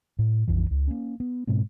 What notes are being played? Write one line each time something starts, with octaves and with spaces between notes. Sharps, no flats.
A2
A#1 F2 E3
C#2
A#3 C#4
B3
G#2 B2 G#3 C4